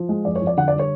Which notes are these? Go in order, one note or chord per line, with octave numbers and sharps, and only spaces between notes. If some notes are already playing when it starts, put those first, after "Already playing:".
Already playing: F3
G#3
F2 D5
C#5
F2
D5
D3 F#5
D5
G3
C#5